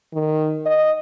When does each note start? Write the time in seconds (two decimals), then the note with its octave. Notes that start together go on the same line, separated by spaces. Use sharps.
0.13 D#3
0.66 D#5